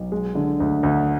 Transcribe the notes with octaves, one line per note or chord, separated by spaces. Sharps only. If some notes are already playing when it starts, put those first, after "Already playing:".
Already playing: B1
G#3
D3
D2
D2